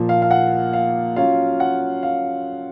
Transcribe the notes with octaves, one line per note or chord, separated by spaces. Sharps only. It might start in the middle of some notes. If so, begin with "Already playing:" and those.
Already playing: A#2 F3 A#3
F5
F5
F#5
F5
F#3 C#4 F4 F5
F#5
F5